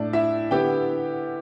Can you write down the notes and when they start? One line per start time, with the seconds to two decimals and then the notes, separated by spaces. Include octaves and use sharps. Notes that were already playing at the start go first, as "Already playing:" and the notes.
Already playing: A2 A3 D4 D5
0.13 E4 E5
0.51 D3 B3 E4 G4 G5